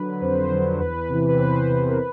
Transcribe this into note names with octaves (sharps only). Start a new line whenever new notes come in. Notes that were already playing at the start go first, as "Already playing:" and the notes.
Already playing: D3 F#3 B4
B4
F2 C5
D3 F#3
E2 B4
C3 E3
B4
E2 C5
C3 E3
A#4
B4